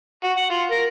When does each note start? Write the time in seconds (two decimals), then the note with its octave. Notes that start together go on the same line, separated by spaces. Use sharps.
0.24 F#4
0.37 F#5
0.50 F4
0.71 A#4